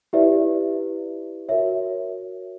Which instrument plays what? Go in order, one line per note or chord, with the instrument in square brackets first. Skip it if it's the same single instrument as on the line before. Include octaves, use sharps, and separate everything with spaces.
[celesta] E4 G4 B4 D5 E5
F#4 A#4 C#5 E5